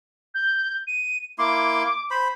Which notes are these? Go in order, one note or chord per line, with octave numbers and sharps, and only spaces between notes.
G6
D#7
A#3 E4 C6 D6
C5 B5